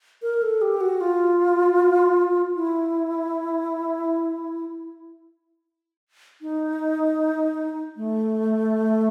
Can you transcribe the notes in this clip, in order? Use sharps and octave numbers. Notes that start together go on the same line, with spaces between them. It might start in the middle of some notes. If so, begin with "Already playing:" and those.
A#4
A4
G4
F#4
F4
E4
D#4
A3